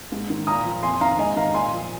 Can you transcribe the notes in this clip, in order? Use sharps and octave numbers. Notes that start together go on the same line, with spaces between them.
G#2
D#3
A#2 A#5 D#6
F3
F2 G#5 C6
D#3 F5 A#5
G#2 D#5 G#5
D#3 F5 A#5
A#2 G#5 C6
F3